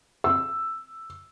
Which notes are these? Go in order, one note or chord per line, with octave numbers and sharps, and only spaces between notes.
E6